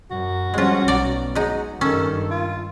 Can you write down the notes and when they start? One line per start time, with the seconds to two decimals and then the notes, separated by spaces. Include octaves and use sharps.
0.10 F#2 F#4
0.54 F3 G3 G#3 C#4 F4
0.88 B1 D5 A#5
1.35 F#3 G#3 D#4
1.81 G2 D#3 C#4 A4
2.30 F4